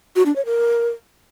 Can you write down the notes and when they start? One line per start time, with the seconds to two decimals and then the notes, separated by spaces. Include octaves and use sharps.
0.16 F#4
0.26 D4
0.36 C#5
0.46 A#4